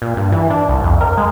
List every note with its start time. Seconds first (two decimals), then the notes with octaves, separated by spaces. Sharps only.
0.02 A#2
0.17 G2
0.32 E3
0.50 D4
0.68 C2
0.83 F2
1.01 A#4
1.18 G#3